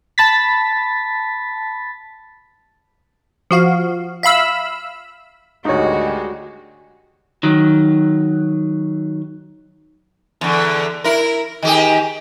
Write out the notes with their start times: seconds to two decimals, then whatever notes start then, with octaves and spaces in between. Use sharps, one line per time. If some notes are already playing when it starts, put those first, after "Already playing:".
0.18 A5 B5 A6 B6
3.51 F3 F#4 F5
4.23 E5 F5 B5 E6
5.65 D2 G#2 D#3 G3 G#3 D#4 F#4 C#5
7.43 D#3 F#3
10.41 E2 D3
11.04 E4 A#4
11.62 D#3 G4 G#4